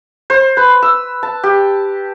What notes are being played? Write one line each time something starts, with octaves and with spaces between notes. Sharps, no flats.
C5
B4
E6
A5
G4